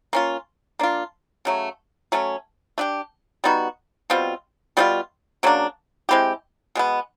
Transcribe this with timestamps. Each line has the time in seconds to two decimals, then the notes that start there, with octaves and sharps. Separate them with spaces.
0.13 A#3 C#4 F4
0.79 A#3 D4 F4
1.45 C#3 F#3 A3
2.12 F#3 A3 C#4
2.78 A3 D4 G4
3.44 G3 B3 D#4 F#4
4.10 B2 G3 C4 F4
4.77 B2 G3 C4 F4
5.43 C#3 F#3 A#3 D4
6.09 G#3 C4 E4 G4
6.75 B2 G#3 B3